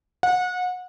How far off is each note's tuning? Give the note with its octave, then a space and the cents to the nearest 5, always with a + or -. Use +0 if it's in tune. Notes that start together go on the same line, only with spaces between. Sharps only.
F#5 -30